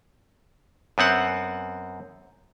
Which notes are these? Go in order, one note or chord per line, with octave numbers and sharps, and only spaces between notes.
F#2 B3 C4 F#5